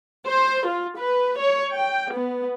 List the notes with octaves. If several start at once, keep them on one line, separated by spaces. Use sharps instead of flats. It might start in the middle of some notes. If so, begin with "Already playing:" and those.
C5
F4
B4
C#5
G5
B3